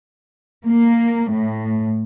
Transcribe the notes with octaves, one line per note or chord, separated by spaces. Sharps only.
A#3
A2